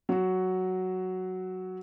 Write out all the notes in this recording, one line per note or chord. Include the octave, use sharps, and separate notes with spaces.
F#3 F#4